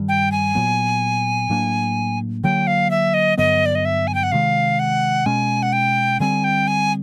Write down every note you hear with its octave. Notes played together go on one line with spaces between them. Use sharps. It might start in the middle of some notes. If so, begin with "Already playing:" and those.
Already playing: G2 D#3 G3
G5
G#5
A#2 F#3 B3
A2 F#3 A#3 D4
D3 F#3 A#3 G5
F5
E5
D#5
G2 D3 F#3 B3 D#5
D5
D#5
E5
G#5
G5
F#5
C3 D#3 G#3 F5
F#5
B2 G#3 C#4 G#5
F#5
G5
D3 G3 C4 G#5
G5
G#5